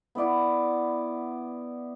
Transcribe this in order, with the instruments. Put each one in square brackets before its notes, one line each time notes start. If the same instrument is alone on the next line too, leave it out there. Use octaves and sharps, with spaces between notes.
[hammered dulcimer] B3 E4 D5 F#5